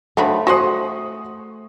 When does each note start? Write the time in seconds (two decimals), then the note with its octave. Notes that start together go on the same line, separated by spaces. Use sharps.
0.17 D3 D#3 F3 F#3 A3 B5
0.47 F#4 G#4 C5 F#5 C#6 D#6